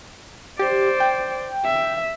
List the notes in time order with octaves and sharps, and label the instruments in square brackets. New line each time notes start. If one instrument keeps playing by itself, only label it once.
[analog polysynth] G4 [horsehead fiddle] C5 D5
[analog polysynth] G5
[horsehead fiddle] E5